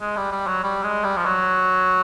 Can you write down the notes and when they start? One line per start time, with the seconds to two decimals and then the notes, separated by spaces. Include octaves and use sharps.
0.01 G#3
0.17 G3
0.32 G3
0.47 F#3
0.64 G3
0.84 G#3
1.04 G3
1.17 F3
1.25 F#3